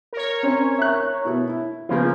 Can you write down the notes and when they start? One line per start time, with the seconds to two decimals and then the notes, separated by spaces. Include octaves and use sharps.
0.13 A#4 C#5
0.43 C4 C#4
0.78 E5 F#6
1.25 B2 E4
1.49 E4
1.89 C#3 F3 A#3 B3 F4